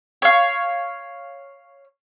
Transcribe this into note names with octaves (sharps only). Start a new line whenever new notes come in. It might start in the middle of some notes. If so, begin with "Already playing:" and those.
C#5 F5